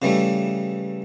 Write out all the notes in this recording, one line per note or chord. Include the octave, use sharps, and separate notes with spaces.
C#3 E3 G3 A3